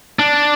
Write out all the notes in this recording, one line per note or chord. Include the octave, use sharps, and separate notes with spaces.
D4